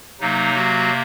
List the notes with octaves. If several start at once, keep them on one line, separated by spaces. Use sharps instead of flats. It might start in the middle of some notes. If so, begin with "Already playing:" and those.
C3 F#3 A#3 D#4
F#3 F#4